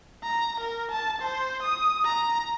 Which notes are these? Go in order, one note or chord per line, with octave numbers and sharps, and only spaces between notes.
A#5
A#4
A5
C5
D#6
A#5